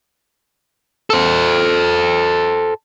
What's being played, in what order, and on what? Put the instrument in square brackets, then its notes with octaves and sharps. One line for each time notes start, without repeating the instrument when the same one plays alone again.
[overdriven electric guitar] A4 C5